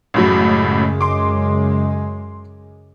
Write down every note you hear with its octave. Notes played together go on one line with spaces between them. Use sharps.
A1 F#2 A2 C#3 F#3 G#3
C6 D6